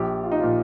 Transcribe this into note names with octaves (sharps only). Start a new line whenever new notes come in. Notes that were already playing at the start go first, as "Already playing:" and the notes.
Already playing: A#1 G4
F4
D#4
A#2 F3 F4